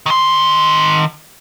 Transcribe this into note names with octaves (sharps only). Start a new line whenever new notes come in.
D#3 C6